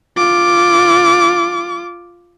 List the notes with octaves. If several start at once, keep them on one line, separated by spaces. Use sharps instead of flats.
F4 D6